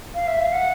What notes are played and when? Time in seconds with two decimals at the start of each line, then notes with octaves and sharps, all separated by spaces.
0.15 F5
0.28 E5
0.40 F5
0.53 F#5